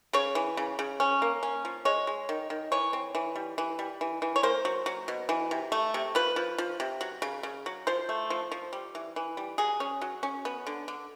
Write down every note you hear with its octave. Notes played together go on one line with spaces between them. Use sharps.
C#3 C#5
E3
C#3
C#3
C#4
A#3
C#4
F3
G#3 C#5
G#3
D#3
D#3
E3 C#5
C4
E3
G3
E3
G3
E3
E3
C#5
A#3 C5
F#3
F#3
B2
E3
C3
A3
C3
F3 B4
F3
F3
C3
F#3
C#3
C#3
F#3
F3 C5
A3
F3
F3
G3
E3
E3
G3
F#3 G#4
C#4
F#3
C#4
B3
D3
D3